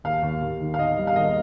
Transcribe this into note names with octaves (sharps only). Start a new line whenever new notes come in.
D#2 F5
D#2
D#2
D#3
F5
D#3 D#5
G3
F5
D#2 D#5